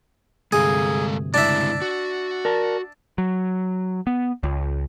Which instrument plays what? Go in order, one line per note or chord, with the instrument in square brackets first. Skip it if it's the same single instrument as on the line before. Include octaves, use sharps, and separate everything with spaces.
[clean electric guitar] D2 G2 C3 [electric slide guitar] G#3 A4 F5 [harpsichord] G#4
[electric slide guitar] C#3 G#3 E4 [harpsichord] D4 E5
[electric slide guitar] F#4
[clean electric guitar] A#4 D5 A5
[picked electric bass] F#3
B3
C#2